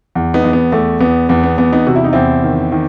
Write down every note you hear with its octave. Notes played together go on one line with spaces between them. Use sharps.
E2
B3 D#4
E2
B3
E2 A3
E2 B3
E2 B3
B3
E2 B3
B3 D#4
C3 F#4
E4
D#4
E2 C4 E4
D#3
D#3